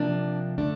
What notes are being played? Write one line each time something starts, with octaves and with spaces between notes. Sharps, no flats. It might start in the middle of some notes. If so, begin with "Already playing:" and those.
Already playing: C3 F3 A#3 D4
D3 A3 D4